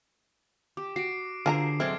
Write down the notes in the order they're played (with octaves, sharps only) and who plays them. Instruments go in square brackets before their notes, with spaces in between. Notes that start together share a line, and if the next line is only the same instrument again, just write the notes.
[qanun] G4 [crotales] D6
[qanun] F#4 [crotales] C7 D7
[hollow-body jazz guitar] D3 [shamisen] F4 A5 A#5 [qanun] G#4 A#4 C5
[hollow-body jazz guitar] F#3 G#3 C4 [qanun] A4 D5 [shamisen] E5 [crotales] F6 G#6